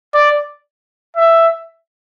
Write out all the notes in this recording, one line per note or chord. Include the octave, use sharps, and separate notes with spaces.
D5
E5